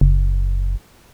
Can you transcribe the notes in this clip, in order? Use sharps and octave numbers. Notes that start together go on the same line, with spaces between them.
F#1